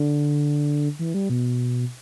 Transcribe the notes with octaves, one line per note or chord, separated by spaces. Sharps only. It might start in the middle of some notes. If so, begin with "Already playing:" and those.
Already playing: D3
E3
G3
B2